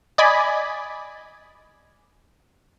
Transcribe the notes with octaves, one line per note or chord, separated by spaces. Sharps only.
D5 D#5 G#5 B5